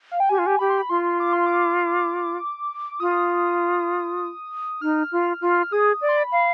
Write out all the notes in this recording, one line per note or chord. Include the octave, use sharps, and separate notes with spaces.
F5
G5
G4 G#5
F4
G4
G4 B5
C6
B5
F4 C6
D6
C6
D6
F4 D#6
D#4 F6
F4
F4
G#4 D#6
D5
C6
B5
F5